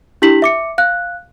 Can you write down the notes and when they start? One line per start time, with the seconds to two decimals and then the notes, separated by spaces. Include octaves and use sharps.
0.22 D4 E4 G4 B6 F#7
0.42 E5 D6 C#7
0.78 F5 F#6